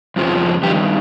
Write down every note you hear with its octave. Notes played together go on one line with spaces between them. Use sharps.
F2 C#3 F3
G2 D#3 G4